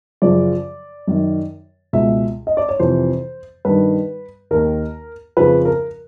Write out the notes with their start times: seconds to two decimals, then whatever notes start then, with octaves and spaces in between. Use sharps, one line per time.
0.22 F#2 C#3 F3 D5
1.08 F#2 D#3
1.93 C#2 B2 E5
2.47 D#5
2.57 D5
2.69 C#5
2.79 F2 C3 E3 C5
3.65 G2 D#3 B4
4.51 D#2 D#3 A#4
5.37 F2 C#3 F3 B4
5.65 A#4